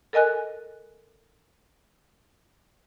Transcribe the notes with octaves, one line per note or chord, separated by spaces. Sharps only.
A4 A#4 D#5 G#5 F#6